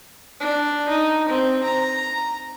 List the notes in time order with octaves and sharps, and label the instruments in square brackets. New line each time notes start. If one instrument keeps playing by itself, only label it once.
[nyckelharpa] D4
D#4
C4
A#5